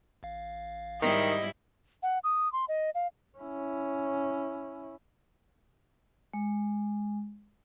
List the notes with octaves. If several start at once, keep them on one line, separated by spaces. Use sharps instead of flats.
A1 F5
G#2 D#3 G3 E4 D#5
F#5
D#6
C6
D#5
F5
C#4 E4
G#3